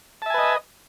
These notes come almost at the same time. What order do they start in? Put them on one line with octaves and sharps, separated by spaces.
A5 E5 G#5 B4 D#5